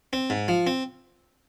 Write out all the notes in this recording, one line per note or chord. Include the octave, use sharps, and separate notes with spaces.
C4
G#2
F3
C4